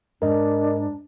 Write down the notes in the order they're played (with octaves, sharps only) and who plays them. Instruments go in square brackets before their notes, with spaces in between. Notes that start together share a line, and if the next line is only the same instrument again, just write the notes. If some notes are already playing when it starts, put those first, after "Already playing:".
[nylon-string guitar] G#2 [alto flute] D4 [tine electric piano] A#4 D#5